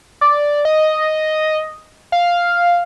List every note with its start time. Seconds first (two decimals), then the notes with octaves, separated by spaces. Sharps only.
0.21 D5
0.65 D#5
2.12 F5